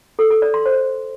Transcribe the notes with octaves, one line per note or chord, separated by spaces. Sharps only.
A4
A4
D5
C6
C5